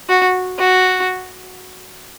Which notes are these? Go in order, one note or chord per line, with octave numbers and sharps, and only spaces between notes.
F#4
F#4